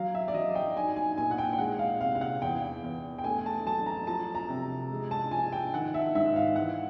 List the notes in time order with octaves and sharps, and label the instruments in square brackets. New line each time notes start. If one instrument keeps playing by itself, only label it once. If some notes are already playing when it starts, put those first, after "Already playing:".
Already playing: [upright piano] F#3 F5
E5
D5
F#3 D#5
G5
D#4 G#5
G#5
A#2 G#5
F#5
G5
G5
G#3 F#5
F5
C3 F5
F5
F#5
E2 G5
E2
G5
A3 G#5
A5
F#3 A5
A#5
F3 A5
A#5
C3
G#3
A5
F3 G#5
G5
D#3 F#5
E5
G#2 E5
F5
E3 F#5